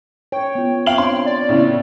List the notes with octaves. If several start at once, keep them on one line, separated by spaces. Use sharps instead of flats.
C#5 G5
B3 F4
C4 C#5 F5 G5 F#7
D4 C6
D5
A2 C#3 B3